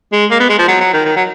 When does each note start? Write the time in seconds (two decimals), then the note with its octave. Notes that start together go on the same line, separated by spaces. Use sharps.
0.13 G#3
0.31 A#3
0.40 B3
0.49 G#3
0.59 F3
0.68 F#3
0.81 F#3
0.93 D#3
1.05 D#3
1.17 F#3